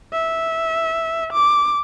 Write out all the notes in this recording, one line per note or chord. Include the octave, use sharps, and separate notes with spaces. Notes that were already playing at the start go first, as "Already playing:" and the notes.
E5
D6